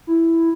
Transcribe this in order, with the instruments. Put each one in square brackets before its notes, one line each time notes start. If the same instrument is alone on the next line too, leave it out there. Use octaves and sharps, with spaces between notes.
[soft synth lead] E4